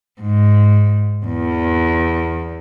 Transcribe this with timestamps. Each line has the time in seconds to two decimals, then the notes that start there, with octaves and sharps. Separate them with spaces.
0.22 G#2
1.26 E2